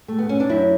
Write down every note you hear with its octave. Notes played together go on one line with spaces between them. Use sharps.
A3
B3
C#4
D4
F#2 E4